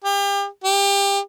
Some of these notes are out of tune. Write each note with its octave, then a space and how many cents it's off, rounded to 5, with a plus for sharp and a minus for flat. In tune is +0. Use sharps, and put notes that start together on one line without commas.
G4 +35
G4 +25